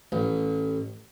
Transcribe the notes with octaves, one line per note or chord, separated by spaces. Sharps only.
A1